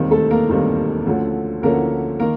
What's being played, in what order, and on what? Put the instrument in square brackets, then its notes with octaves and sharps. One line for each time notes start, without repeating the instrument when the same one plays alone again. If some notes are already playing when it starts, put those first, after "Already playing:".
Already playing: [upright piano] E1 D#2 D#3 G3 C4
A3 A4
A#3 A#4
E1 D#2 D#3 G3 C4
D2 D3 F3 A3 C#4
D2 D3 F3 A3 A#3 C#4 A#4
D#3 A#3 A#4